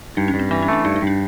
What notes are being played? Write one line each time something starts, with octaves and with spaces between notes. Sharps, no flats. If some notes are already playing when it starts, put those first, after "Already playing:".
G2 D#4
C#4
G2
C4
E3 C4
C#4
A3 D4
G2 D#4
D#4
G2 D4